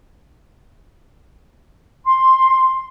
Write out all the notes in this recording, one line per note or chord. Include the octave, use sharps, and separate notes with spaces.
C6